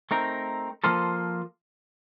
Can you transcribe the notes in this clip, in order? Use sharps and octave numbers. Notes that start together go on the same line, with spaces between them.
A3 C4 D#4 A#4
F3 A#3 F4 A4 C5